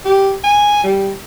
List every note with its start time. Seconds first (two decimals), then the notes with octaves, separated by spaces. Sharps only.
0.05 G4
0.43 G#5
0.84 G3